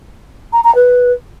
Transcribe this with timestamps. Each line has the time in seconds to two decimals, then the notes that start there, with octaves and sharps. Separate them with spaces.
0.53 A#5
0.64 A#5
0.75 B4